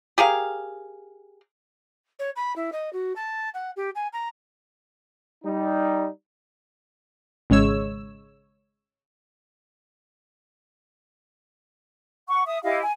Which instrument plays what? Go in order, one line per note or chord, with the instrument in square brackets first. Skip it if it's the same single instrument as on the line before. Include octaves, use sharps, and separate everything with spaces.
[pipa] G4 G#4 A#4 F5
[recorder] C#5
B5
E4
D#5
F#4
A5
F#5
G4
G#5
A#5
[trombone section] G3 D#4
[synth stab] G#1 C#3 G#3 C#5 E6
[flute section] F#5 C#6
E5 D#6
E4 G4 D#5 F5
G#5